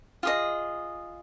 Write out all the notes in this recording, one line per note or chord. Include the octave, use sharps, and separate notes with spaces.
F4 G#4 D#5